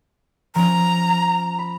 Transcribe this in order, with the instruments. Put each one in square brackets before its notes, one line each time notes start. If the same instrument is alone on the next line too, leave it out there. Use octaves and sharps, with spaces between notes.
[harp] F3 C#4 [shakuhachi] A#5
[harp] B5